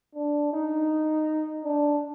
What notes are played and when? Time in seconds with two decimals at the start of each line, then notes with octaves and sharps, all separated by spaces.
0.15 D4
0.53 D#4
1.64 D4